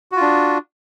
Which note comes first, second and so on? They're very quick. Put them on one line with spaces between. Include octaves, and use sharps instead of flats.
F#4 F4 D4